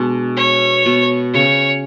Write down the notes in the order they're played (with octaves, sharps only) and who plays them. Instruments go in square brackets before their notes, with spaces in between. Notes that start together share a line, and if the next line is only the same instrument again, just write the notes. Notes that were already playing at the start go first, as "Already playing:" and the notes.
Already playing: [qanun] B2 G#3 D4
[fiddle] C#5
[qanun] B2
[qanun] C#3 [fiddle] C#5